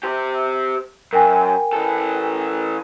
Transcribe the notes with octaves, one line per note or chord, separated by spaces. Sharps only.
G4 C5
F#2 A#4 G5 G#5
E3 A4